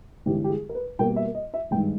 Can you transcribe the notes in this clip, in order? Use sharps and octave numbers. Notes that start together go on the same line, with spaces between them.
G1 G2 E3 G#3 G4
G4
G#4
A#4
B4
B2 G3 A#3 G5
E5
D#5
E5
G#1 G2 D#3 G#3 G5